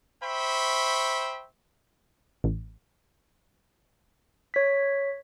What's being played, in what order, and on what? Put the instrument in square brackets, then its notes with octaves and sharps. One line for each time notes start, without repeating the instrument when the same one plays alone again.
[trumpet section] C5 E5 G5 B5 C#6
[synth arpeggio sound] A1
[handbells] C#5 B6